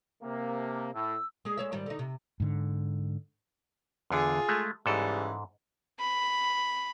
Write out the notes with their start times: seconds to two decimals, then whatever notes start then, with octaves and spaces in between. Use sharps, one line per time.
0.23 C3 A#3
0.57 A5
0.93 A2 E6
1.45 G#3 G#4
1.57 G#3 C#5 E5
1.72 G#2 D#3 G3
1.86 D3 D#4
1.99 C3
2.40 G#2 D3
4.10 E2 D3 F4 G#4
4.49 G#3 A3
4.86 G#2 C#3 E3 G3 A4
5.99 B5